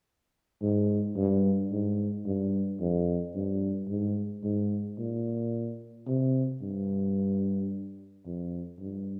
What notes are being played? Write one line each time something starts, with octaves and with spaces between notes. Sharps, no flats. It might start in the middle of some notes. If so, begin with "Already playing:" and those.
G#2
G2
G#2
G2
F2
G2
G#2
G#2
A#2
C3
G2
F2
G2